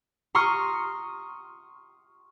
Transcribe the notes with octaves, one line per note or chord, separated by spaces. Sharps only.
A#5 C6 C#6 D#6 F6